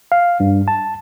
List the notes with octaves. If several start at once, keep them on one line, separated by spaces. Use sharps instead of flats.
F5
G2
A5